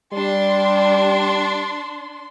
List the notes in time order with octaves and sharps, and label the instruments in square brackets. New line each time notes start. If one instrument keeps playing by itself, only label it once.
[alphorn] G3 [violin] D4 C6